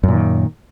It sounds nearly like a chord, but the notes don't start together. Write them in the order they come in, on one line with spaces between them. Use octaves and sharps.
F#2 A#2 D#3